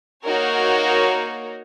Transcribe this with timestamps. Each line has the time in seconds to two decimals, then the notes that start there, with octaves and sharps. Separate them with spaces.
0.24 A#3 D#4 F#4 A#4 C#5